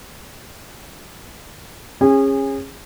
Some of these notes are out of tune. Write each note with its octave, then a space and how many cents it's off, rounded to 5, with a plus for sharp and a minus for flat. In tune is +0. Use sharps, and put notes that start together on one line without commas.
C#4 -25 G#4 -30